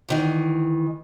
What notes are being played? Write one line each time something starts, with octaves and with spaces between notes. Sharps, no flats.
D2 D#3 E3